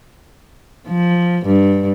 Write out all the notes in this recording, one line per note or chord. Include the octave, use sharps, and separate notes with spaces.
F3
G2